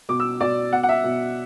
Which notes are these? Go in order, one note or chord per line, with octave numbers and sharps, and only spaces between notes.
B2 D6
E6
B2 D5
B2 F#5
F#5
E5
B2